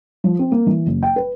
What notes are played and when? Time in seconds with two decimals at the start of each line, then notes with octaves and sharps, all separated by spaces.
0.24 F3
0.39 C4
0.52 A#3
0.67 E3
0.87 F#1
1.03 G5
1.16 B4